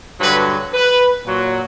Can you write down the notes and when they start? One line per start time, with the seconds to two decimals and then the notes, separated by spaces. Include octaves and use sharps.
0.19 G2 D3 F#3 B4
0.72 B4
1.24 A#2 F#3